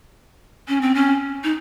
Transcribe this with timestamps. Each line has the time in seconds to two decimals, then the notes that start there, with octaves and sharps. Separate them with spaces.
0.68 C#4
0.81 C4
0.94 C#4
1.44 D#4